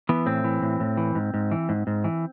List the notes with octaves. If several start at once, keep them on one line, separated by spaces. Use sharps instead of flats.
E3 B3
A2 C4
E3
A2
A2
E3
G#2
G#2
E3
G#2
G#2
E3